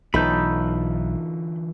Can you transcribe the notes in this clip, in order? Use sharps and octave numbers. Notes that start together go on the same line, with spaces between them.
B1 D3 E3 A3 D#4 F4 B5 G6